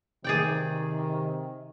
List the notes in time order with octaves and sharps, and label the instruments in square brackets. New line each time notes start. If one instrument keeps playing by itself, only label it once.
[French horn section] C3 D#3 [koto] G#4 D5 G5